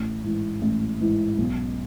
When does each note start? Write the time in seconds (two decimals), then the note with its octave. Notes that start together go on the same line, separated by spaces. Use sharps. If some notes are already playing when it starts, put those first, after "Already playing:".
Already playing: A1
0.24 G#2 E3
0.62 A1
1.00 G#2 E3
1.38 B1